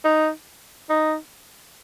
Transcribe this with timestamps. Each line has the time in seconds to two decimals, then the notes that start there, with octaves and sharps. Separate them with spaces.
0.04 D#4
0.89 D#4